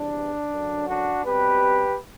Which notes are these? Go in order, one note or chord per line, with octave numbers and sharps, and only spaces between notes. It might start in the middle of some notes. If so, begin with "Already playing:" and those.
Already playing: E2 C3 E3 G3 D4
F#2 D3 F#3
D4 F#4
B2 G3 C4 G4 B4